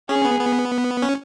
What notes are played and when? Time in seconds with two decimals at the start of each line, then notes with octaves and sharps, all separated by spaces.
0.09 C#4 G#4
0.25 B3
0.40 B3
1.02 C#4